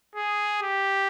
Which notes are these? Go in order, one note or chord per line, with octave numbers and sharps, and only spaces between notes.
G#4
G4